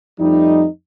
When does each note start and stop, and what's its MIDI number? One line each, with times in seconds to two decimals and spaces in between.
0.19 0.65 41
0.19 0.65 53
0.19 0.65 55
0.19 0.65 57
0.19 0.65 63